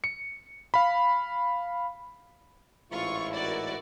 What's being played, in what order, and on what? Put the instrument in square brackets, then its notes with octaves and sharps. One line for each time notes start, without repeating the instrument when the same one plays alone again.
[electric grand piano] C#7
F5 B5
[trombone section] A1 G#2 E4 [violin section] F4 C#6
[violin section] F#4 A#4 D5